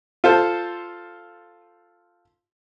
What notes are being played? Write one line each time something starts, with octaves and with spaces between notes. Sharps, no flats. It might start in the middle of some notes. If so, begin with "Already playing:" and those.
F4 A4 C5